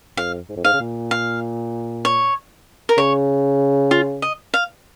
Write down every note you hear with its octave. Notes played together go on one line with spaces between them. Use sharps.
F2 F5
G#2
F2
G#2 F5
C#3
A#2
F5
C#5
A#4
C#3 C#5
F4
D#5
F5